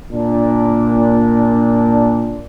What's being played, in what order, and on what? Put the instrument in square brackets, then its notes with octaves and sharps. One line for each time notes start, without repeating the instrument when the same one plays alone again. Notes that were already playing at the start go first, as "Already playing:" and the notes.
[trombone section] A#2 D4